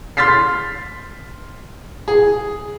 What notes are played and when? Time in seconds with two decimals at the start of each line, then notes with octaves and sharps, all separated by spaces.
0.17 C6 F6 A6 B6 C7
2.08 G#4